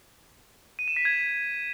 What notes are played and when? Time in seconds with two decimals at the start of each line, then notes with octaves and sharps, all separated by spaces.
0.79 D#7
0.88 E7
0.96 B6
1.05 G#6